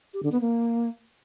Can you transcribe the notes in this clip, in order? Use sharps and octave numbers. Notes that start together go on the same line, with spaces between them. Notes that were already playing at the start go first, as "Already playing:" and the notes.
G4
D3
B3
A#3